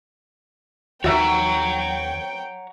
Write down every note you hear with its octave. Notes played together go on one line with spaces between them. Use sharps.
D#2 D#3 F#4 C#5 E5 F#5 G5 A#5